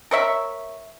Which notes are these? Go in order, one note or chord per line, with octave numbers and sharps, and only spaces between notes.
A#4 C#5 E5